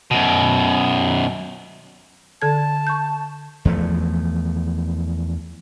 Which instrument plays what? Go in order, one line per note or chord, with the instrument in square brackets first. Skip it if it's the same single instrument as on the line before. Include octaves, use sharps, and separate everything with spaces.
[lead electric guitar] F#2 B2
[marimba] D3 A4 G#6 [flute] A5
[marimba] C#6 G6
[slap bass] E2 F3 A3